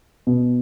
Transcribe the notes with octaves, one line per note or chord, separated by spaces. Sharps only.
B2